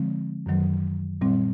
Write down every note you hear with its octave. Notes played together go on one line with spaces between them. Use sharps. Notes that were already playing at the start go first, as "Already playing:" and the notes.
Already playing: D3 F3 G#3 C4
F#2 D#3 F#3
A#2 G3 C4